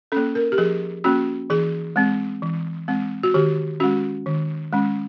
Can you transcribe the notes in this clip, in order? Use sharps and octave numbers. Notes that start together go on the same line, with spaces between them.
A#3 C#4 A4
A#4
G4
F3 G#4
A#3 C#4 F#4
E3 G#4
G#3 C4
E3
G#3 C4
F#4
D#3 G4
G#3 C#4 F#4
D#3
G#3 C#4